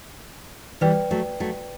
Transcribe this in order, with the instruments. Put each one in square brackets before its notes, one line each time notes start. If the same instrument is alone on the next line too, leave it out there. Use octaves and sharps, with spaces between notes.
[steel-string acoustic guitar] E3 G3 [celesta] B4 D5 G5
[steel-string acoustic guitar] F#3 A3
F#3 A3